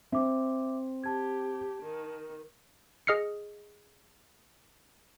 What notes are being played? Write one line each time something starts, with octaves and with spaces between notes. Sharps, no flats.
C4 E5 D6
G4 A5 G#6
D#3
G#4 D#5 F6 C7 C#7